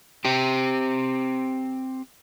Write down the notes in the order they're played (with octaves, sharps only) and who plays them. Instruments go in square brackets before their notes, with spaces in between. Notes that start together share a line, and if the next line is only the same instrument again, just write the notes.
[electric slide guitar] C4 G4